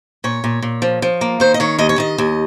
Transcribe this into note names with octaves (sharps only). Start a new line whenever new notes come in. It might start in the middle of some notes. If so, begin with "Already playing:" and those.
A#2 C#5
A#2
A#2
F3
F3
A#3
D#3 C5
D#5
D#3 C#5
D#2 D#5
C#5
D#3 D#5
D#2